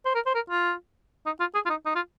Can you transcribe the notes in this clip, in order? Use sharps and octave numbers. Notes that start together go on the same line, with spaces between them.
C5
A#4
C5
A#4
F4
D#4
F4
G#4
F4
D#4
D#4
F4